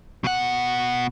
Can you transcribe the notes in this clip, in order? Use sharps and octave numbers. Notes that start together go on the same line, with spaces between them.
B2 F#5